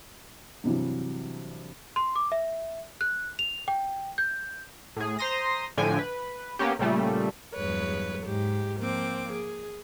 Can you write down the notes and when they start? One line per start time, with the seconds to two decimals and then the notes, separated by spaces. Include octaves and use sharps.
0.64 G2 C3 E3 F#3
1.96 C6
2.16 D6
2.32 E5
3.01 F#6
3.39 F7
3.68 G5
4.18 G6
4.96 A2 G#4
5.19 C5 A#5 C6 D#6 A#6
5.77 A2 D3 F3 G5 G#5
5.99 B4
6.59 A#3 B3 C#4 G4
6.79 A#2 C#3 G3 A3
7.53 E2 G2 F#3 G#3 B4 C#5
8.23 G#2 G4
8.77 F3 A#3 C4 D6
9.30 G#4